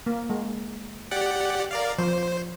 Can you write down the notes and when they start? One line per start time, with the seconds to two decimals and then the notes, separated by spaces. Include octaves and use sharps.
0.06 A#3
0.30 G#3
1.11 G4 D5 F#5
1.71 A#4 D5 F5
1.99 F3 C5